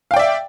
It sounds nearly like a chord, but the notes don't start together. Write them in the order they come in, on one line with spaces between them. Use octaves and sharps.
F5 G5 D5 E5